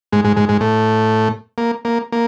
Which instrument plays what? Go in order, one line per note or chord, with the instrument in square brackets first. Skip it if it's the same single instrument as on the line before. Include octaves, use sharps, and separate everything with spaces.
[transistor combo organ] G#2 G#3
G#2 G#3
G#2 G#3
G#2 G#3
A2 A3
A#3
A#3
A#3